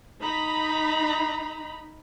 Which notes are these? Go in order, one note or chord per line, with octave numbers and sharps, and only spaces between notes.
D#4 A#5 B5